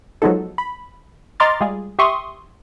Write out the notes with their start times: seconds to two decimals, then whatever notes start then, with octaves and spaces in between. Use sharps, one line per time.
0.22 F3 F#3 G#3 B3 D#4 A4
0.58 B5
1.40 D#5 A#5 C6 D6 F6 A6
1.60 G3 G#3 F4 G#4
1.99 G4 E5 C6 C#6 D#6